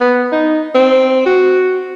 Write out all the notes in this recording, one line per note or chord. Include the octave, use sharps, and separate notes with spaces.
B3
D#4
C4
F#4